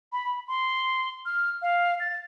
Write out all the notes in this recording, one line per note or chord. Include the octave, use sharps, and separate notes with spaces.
B5
C6
F6
F5
A6